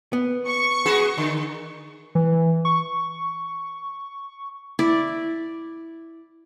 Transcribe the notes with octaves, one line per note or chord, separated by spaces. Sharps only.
B3
C#6
F#4 G#4 B4
D3
E3
C#6
E4 D5